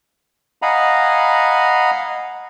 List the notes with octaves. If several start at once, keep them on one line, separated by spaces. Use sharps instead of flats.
D#5 F5 F#5 G#5 A#5 B5